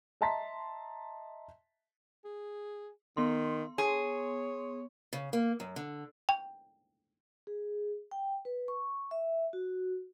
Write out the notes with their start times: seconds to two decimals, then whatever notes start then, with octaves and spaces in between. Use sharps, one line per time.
0.21 D#5 E5 A5 A#5 C6 B6
2.25 G#4
3.17 D#3 B3 C6
3.78 G#4 C#5
5.13 C#3
5.33 A#3
5.60 F#2
5.76 D3
6.29 G5
7.47 G#4
8.11 G5
8.45 B4
8.68 C#6
9.11 E5
9.53 F#4